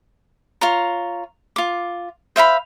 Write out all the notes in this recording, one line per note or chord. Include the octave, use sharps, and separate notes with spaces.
F4 C#5 A#5
F4 D6
C5 E5 F5 B5